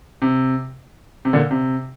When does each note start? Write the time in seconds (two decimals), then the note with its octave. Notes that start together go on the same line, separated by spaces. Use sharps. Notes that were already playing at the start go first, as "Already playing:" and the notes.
0.22 C3
1.25 C3
1.33 A#2 D3
1.51 C3